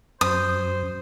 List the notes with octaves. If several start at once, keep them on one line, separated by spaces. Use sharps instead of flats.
F#2 C5 D#6